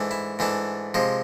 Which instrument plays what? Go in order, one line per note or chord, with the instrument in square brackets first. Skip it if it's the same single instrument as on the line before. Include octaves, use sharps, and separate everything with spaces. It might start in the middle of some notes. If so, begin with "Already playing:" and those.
Already playing: [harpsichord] G#2 E3 A3 D4
E4
G#2 E3 A3 D4
C3 F3 G#3